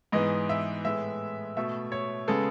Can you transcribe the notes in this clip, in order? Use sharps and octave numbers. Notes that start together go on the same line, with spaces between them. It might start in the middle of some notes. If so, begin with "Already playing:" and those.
G#2 E3 B3 D#5
E5
A2 G#3 B3 E5
B2 A3 E5
C#5
C#3 G#3 B3 A4